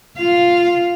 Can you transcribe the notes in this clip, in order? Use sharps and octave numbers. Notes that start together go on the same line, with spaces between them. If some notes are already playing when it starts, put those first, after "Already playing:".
F4 F5